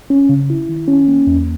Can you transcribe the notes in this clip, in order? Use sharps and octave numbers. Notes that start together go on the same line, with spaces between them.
C#4
C#3
E4
D#3
C#4
A#3
E2